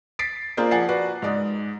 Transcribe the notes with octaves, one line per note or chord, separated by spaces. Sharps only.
A6 B6 C7 D7
A#3 D4 F4 G#4 A#4 C5
F3 D5 F#5 G#5 A6 C7
F#4 B4 D5
G#2 G#3 D5 D#6